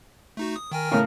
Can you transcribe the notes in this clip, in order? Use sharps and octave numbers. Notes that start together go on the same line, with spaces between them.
A3 D#4 F#4
D#6
D#3 A#4 G5 G#5
A2 C#3 A#4